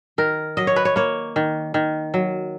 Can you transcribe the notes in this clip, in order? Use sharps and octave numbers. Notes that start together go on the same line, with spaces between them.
D#3 A#4
F#3 D#5
C#5
B4
C#5
A#3 C#5
D#3
D#3
F#3